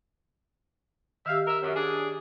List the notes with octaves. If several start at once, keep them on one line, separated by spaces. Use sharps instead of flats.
D#3 G4 E5 F5
A#4 E5
F#2
D4 G#4